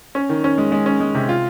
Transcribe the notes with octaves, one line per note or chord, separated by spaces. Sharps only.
C#4
D#3
C#4
G#3
G#3
C#4
G#3
C3
F4